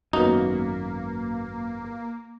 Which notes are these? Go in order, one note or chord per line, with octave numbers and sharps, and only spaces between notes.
G#1 F#2 A#3 B3 D#4 F#4